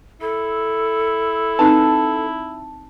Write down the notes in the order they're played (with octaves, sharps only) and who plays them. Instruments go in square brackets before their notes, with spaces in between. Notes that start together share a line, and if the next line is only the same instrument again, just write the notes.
[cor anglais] E4 [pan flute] A4
[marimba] C4 D#4 B4 [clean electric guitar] A5